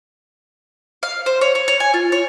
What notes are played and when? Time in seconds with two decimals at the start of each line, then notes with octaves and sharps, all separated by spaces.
1.03 F5
1.26 C5
1.41 C#5
1.55 C#5
1.68 C#5
1.80 G#5
1.94 F4
2.12 C#5